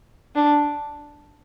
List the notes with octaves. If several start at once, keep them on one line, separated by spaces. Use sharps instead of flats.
D4